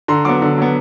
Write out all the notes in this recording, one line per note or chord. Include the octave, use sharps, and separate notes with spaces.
D3 A#5 C6
F#3 B3 C6 D6
D3
F#3 B3